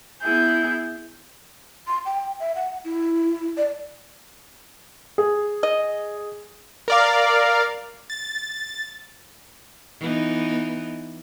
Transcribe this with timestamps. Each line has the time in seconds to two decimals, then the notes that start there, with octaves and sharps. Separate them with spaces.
0.21 B3 E4 G#4 G6
1.87 C6
2.06 G5
2.40 E5
2.55 F#5
2.85 E4
3.57 D5
5.18 G#4
5.63 D#5
6.88 A#4 D5 F5
8.10 A6
10.00 E3 B3 D#4